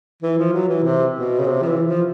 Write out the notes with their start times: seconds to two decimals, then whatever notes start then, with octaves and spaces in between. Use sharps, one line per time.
0.23 E3
0.38 F3
0.53 F#3
0.69 E3
0.84 C3
1.15 B2
1.39 C#3
1.46 C3
1.62 F3
1.66 E3
1.87 F3